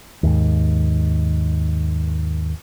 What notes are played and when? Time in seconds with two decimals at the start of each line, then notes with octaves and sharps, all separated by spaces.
0.23 D#2 G#2